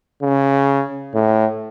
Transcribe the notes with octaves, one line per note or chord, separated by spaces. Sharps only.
C#3
A2